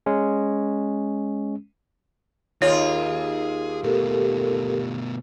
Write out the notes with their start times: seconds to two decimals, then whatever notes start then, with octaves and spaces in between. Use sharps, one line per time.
0.06 G#3 C#4
2.62 D#2 F4 G#4 C#5
3.84 B2 A3 G4 A4 A#4